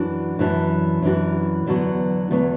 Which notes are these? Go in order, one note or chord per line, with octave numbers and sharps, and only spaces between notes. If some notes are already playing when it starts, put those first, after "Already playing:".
Already playing: F#2 E3 D4 F#4
F#2 E3 D4 F#4
F#2 E3 D4 F#4
E2 D3 F#3 B3
E2 D3 F#3 B3